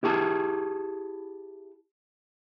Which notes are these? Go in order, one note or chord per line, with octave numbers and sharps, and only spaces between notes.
E4 G4 G#4 A5